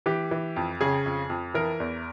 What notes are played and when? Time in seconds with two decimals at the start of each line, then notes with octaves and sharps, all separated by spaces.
0.06 E3 G4
0.31 E3
0.56 F2
0.81 C#3 G#4
1.06 F2
1.30 F2
1.54 E3 A#4
1.80 E2